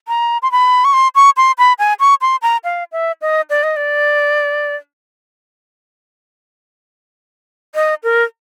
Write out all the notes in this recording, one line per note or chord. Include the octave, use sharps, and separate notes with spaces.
A#5
C6
B5
C#6
C6
C#6
C6
B5
G#5
C#6
C6
A#5
F5
E5
D#5
D5
D#5
D5
D#5
A#4